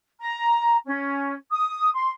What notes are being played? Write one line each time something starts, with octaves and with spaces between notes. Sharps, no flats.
A#5
C#4
D#6
C6